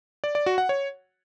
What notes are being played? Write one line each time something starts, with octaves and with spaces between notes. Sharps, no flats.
D5
D5
F#4
F#5
C#5